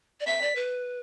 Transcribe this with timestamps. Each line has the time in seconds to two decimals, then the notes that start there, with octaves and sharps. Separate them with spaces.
0.20 D5
0.27 E5 B6
0.42 D5
0.56 B4